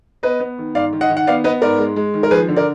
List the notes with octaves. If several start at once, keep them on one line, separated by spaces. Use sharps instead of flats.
B3 B4 D#5
B3
D#3
G#2 D5 F5
D#3
D#5 F#5
D#3
F#5
B3 D5 F5
B3 B4 D#5
G#2 A#4 D5
G#3
G#3
D#3
A#4
F3 G#4 B4
D3
A#4 D5